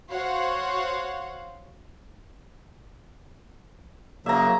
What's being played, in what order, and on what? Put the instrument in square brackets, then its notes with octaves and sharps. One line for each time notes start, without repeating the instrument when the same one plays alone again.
[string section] F#4 C5 C#5 F5 F#5
[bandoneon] C#3 F#3 A#3 [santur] E5 A#5